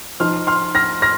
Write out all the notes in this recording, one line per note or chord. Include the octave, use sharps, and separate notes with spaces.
F3 D#4 C6 F6
C6 F6
F6 A#6
F6 A#6